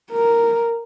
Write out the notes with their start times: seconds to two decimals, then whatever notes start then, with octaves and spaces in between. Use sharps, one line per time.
0.11 A#4